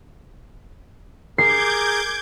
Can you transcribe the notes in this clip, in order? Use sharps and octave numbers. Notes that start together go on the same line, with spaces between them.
G#4 A#4 D6 G6 G#6 C7